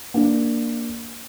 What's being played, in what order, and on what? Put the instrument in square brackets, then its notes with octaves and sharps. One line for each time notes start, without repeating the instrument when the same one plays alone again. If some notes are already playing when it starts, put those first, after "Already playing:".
[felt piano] A#3 D4